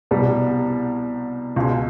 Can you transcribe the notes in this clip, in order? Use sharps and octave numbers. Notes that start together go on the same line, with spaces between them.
C2 B2 G3
C#2 B2 G#3